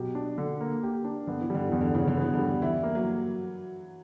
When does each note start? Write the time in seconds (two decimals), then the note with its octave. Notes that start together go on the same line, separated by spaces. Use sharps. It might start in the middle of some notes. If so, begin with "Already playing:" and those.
Already playing: B2 F#3 G4
0.15 D4
0.38 D3
0.61 A#3
0.83 G4
1.04 D4
1.27 D3 B3
1.41 E3
1.50 D3 G3
1.68 E2 E3
1.81 D3
1.94 C#3 E3
2.07 D3
2.17 E3 B3
2.34 D3
2.39 G3
2.62 E3 E4
2.83 A#3
2.95 F#3